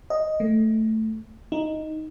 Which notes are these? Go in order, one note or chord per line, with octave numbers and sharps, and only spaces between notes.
D#5
A3
D#4